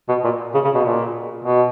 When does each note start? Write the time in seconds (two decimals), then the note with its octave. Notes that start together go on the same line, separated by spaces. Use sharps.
0.09 B2
0.24 A#2
0.54 C#3
0.64 C#3
0.74 B2
0.84 A#2
1.44 B2